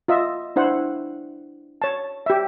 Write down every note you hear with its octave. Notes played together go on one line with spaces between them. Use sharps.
F4 D#5 E5
D4 E4 C5 F#5
C#5 A5
G4 E5